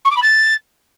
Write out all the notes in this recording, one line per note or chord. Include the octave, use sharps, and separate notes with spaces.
C#6
D6
B5
A6